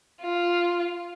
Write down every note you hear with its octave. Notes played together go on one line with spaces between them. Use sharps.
F4